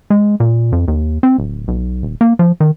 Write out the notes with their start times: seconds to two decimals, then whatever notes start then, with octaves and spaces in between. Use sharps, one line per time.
0.10 G#3
0.40 A#2
0.72 F2
0.88 D#2
1.23 C4
1.38 D1
1.68 B1
2.03 D#1
2.21 A#3
2.39 F3
2.60 D#3